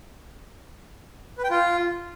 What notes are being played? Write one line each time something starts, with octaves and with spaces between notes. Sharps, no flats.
B4
G5
F4